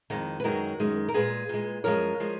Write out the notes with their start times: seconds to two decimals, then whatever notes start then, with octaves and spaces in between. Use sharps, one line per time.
0.10 F2 D#3 G#3
0.40 B4
0.44 F#2 D#3 G#3 F#4 A#4
0.80 F#2 D#3 G#3
1.09 A#4
1.14 A#2 G#3 G#4 B4
1.49 A#2 G#3
1.84 F#2 F3 G#3 A#4 C#5
2.20 F3 G#3